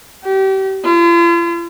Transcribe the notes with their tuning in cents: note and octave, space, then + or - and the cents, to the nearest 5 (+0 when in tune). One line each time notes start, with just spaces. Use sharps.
G4 -30
F4 -45